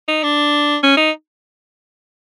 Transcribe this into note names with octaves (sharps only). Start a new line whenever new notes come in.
D#4
D4
C#4
D#4